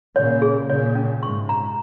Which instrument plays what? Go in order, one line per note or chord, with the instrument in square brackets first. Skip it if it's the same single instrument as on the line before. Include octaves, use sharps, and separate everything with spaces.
[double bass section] A#2 C#3 [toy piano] C#5
[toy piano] G#4
[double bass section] A#2 C#3 [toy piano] C#5
[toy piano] C#4
[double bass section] G#2 C3 [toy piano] C#6
[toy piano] A#5